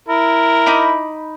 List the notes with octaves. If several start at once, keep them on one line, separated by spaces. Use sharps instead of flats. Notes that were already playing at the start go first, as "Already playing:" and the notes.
E4 A#4
D#4 B5 D6